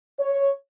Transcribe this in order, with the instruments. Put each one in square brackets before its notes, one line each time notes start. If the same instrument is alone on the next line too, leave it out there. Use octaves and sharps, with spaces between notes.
[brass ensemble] C#5